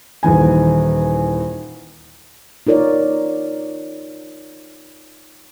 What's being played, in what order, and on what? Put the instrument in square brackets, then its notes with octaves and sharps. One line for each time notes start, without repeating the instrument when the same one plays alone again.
[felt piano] D#1 D#3 E3 G#5
[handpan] D#4 F4 A#4 C#5 D5